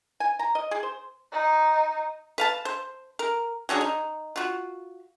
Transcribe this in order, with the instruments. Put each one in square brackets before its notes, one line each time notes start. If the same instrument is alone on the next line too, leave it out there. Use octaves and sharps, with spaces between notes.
[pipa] G#5
A#5
D#5
G#4
C5
[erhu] D#4
[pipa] B4 F5 A5
C5
A#4
F#3 C#4 D4 G#4
D#4
F4 F#4